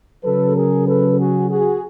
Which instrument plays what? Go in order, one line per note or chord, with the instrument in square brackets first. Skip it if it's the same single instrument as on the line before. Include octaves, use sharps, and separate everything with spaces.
[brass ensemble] C#3 F#3 A4 B4
G#4 A#4
A4 B4
F#4 G#4
F#4 G#4